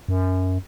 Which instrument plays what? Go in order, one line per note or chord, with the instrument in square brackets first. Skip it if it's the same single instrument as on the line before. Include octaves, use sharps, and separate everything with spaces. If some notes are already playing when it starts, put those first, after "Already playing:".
[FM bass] F#2